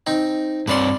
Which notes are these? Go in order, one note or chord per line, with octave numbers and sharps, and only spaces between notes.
C4 D#4
G2 C4 B4 C#5 D5 C6